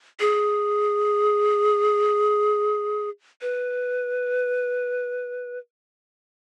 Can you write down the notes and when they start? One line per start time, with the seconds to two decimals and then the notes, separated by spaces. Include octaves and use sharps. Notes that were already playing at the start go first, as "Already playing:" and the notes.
0.20 G#4
3.41 B4